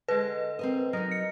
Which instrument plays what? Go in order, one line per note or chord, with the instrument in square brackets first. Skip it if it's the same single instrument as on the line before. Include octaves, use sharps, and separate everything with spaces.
[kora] D3 G#3 [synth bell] B4
[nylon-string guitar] C4 A#4 D#5
[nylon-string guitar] F#3 D#4 [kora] A#4 D#5
[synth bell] C#7